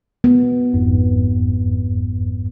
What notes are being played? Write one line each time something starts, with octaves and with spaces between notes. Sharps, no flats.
B3
G1 F2 G#2